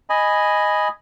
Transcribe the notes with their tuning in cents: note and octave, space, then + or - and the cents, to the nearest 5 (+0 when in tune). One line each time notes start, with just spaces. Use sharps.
D#5 +0 G#5 +0 B5 +0